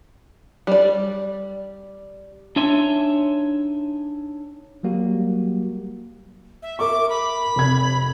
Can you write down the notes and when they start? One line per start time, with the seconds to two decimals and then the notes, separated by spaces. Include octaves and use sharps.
0.67 G3 D5
2.56 D4 D#4 C#5 E5 G#5 C6
4.83 F#3 G3 A#3 F#4 G4
6.62 E5
6.79 A#4 E5 C#6 D6
7.09 B5
7.56 F1 G#6